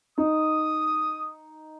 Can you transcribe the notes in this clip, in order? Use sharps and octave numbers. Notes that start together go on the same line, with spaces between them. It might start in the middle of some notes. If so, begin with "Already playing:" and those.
D#4 D#6